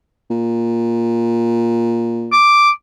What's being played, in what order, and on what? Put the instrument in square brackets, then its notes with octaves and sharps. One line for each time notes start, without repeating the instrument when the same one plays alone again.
[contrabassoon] A#2
[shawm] D6